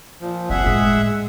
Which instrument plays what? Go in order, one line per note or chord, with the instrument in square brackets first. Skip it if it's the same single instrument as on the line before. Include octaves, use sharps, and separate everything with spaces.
[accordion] A#2 F3
[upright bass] F#1 [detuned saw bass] C2 [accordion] G#4 E5 F#5
[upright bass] A2 [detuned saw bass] G#3